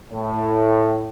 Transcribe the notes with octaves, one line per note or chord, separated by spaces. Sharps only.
A2